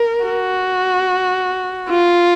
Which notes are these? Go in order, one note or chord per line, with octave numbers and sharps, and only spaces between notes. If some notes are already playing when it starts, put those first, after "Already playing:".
Already playing: A#4
F#4
F4